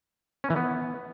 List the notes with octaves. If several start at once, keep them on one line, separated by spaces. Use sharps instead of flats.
C#4
E3
B3